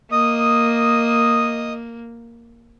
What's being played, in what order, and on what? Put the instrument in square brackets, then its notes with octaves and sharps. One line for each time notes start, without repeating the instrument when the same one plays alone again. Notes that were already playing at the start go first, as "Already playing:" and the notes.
[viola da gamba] A#3 [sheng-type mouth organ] D#5 D#6